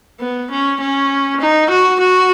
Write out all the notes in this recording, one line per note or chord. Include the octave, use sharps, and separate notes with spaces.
B3
C#4
C#4
D#4
F#4
F#4